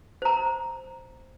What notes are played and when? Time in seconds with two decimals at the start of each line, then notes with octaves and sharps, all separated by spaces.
0.22 C5 A#5